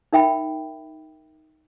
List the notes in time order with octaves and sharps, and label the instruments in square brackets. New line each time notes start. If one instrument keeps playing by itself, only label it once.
[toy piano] D#4 A#4 E5 G5 B5